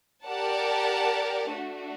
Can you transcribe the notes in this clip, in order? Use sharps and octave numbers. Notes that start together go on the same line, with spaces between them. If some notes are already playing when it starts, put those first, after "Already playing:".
G4 A#4 D5 F#5 A5
A3 D4 F#4